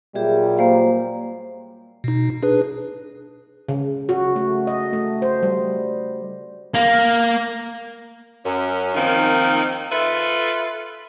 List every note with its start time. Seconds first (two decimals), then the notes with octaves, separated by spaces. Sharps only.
0.15 A#2 F#3 G3 G4 G#4 E5
0.58 A#3 C5 F5
2.04 B2 D#4
2.43 D4 G#4 B4
3.69 C#3
4.09 F#4
4.36 A3
4.67 D#5
4.93 A3
5.22 C5
5.43 G3
6.74 A#3
8.45 F#2 C#4
8.95 D#3 F3 A#3 C4 D#4
9.92 F4 A4 B4 E5